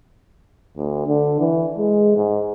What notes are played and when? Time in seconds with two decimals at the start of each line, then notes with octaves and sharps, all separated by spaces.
0.77 D2
1.07 D3
1.40 E3
1.78 G#3
2.16 G#2